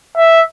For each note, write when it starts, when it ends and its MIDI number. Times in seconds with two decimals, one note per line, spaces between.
0.17 0.41 76